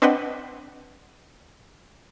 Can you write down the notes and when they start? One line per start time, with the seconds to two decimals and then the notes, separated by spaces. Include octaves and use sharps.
0.02 C4 D4 B4 D#5 F#5 G5